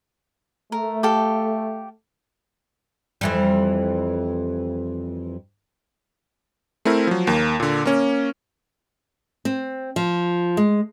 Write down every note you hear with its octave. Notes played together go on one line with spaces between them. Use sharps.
A3 A#4
G4 A4 F5
F2 E3 G3
A3 C4 E4 A#4
F3 F#3
D#2 A#3
A#2 D3
A#3 C#4
C4
F3
G#3